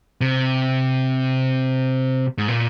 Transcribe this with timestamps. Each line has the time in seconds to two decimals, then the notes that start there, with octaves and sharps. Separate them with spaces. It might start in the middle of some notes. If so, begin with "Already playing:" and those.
0.21 C3
2.38 G#2
2.48 A#2